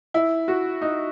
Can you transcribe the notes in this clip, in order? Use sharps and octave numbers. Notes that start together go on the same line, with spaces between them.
E4
F#4
D#4